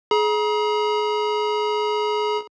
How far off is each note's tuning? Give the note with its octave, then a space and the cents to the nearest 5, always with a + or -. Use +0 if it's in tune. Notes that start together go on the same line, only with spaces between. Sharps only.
G#4 +30 A#5 +40